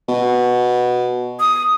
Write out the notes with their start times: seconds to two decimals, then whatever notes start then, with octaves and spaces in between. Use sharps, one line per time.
0.08 B2
1.40 D#6